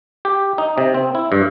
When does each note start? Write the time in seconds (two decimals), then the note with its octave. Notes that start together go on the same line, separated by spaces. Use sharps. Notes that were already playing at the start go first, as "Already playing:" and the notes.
0.25 G4
0.58 D#4
0.78 C3
0.94 C4
1.15 E4
1.32 G2